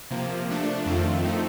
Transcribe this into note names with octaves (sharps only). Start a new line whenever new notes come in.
C3 F3 A#3
F3 A3 D4
F2 D#3 A3 C4 F4
F3 A3 C4 D#4